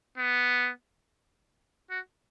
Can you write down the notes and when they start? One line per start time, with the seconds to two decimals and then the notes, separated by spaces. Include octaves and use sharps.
0.18 B3
1.90 F#4